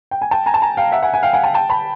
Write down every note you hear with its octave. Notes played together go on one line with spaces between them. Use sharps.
G5
G#5
G5 A5
G#5 A#5
A5
G#5 A#5
F5 G5
E5 F#5
F#5 G#5
F#5 G#5
F5 G5
F#5 G#5
G5 A5
G5 A5
A5 B5